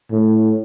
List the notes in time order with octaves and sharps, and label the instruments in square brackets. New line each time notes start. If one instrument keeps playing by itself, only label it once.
[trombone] A2